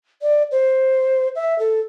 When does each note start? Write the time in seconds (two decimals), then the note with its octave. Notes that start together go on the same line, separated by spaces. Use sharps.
0.22 D5
0.51 C5
1.35 E5
1.59 A4